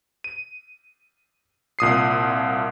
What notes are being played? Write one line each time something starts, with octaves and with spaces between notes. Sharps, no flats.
D#7
C2 A#2 D#6 C7